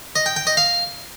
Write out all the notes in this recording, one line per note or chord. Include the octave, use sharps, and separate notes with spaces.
D#5
G5
G5
D#5
F5